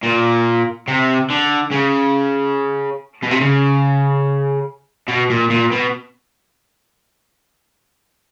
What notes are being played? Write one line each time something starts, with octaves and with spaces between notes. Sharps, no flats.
A#2
C3
D3
C#3
B2
C3
C#3
B2
A#2
A#2
B2